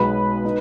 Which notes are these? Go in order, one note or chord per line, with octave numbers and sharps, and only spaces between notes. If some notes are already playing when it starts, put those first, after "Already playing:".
Already playing: B1 B2 G#3 B3 D#4 B4 B5
D#4